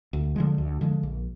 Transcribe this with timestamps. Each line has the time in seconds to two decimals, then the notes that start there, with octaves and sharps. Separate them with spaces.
0.13 D2
0.36 D3 F3 G#3
0.58 D2
0.81 D3 F3 G#3
1.03 A#1